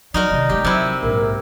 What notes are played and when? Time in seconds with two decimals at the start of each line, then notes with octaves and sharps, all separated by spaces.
0.14 F#3 G3 D#4 F#4 A#4 D5
0.31 C3 D#3
0.49 G3 G#3 G4
0.65 C3 F#3 E4
1.03 A#1 G#2 A#4